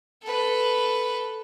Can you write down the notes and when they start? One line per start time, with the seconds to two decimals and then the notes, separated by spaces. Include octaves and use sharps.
0.23 A4 B4